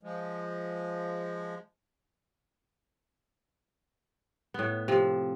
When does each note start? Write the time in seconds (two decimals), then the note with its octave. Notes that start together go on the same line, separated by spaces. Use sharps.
0.03 F3 G#3
4.54 A2 B3
4.88 C3 F3